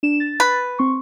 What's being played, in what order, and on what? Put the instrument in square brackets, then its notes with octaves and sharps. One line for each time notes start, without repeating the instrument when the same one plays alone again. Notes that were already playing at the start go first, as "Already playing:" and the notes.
[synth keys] D4 E7
A6
[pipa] B4
[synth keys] C4 C6 C#6